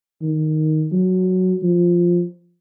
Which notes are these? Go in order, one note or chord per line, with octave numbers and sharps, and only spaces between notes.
D#3
F#3
F3